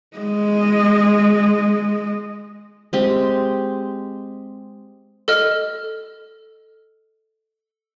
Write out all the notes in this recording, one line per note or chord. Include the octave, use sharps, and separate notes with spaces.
G#3 D#5
G#3 C4 G4
A4 D#5 F6